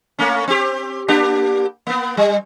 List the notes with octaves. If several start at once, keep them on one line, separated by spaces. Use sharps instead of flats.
A3 A#3 C#4
C4 G4
A#3 D4 G4
A#3 B3
G3